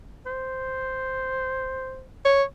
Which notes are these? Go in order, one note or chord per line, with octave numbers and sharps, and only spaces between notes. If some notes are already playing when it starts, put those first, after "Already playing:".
C5
C#5